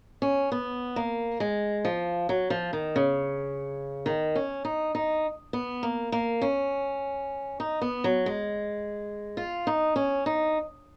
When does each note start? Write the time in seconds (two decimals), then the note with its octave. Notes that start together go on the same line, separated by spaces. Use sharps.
0.22 C#4
0.52 B3
0.96 A#3
1.40 G#3
1.85 F3
2.29 F#3
2.50 F3
2.73 D#3
2.96 C#3
4.06 D#3
4.35 C#4
4.65 D#4
4.95 D#4
5.53 B3
5.83 A#3
6.12 A#3
6.42 C#4
7.60 D#4
7.82 B3
8.04 F#3
8.26 G#3
9.37 F4
9.67 D#4
9.96 C#4
10.26 D#4